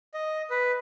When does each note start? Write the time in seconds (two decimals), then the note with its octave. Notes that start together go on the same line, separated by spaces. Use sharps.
0.14 D#5
0.50 B4